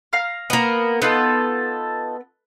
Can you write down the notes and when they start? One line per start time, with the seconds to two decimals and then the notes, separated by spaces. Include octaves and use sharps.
0.13 F5 A#5 F6
0.50 A#3 B3
1.02 B3 D#4 F4 A4